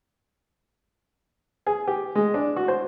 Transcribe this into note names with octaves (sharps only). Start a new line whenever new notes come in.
G#4
G4
G#3
D4
F#4
C5